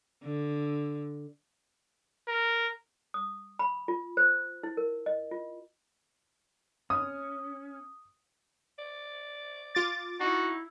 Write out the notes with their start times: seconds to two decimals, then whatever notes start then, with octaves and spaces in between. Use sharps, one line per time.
0.24 D3
2.28 A#4
3.14 D#6
3.59 B5
3.88 F4
4.17 C5
4.63 E4
4.77 A#4
5.06 D#5
5.31 F4
6.90 C#4 D#6
8.79 D5
9.75 F4 D6 A6
10.20 D#4 E4 F#4